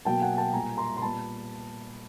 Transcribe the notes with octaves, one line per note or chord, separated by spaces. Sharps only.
B2 F#3 A#3 G5 A5
F#5 G#5
G5 A5
A#2 G3 A#3 G#5 A#5
A#5 C6
C6
A#2 G3 B3 A5 B5